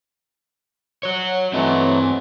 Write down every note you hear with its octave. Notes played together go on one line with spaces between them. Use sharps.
F#4 C#5
E3 F#3 A3 C4 D#5